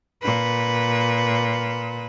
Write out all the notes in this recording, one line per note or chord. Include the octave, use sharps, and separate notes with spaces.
A#2 B4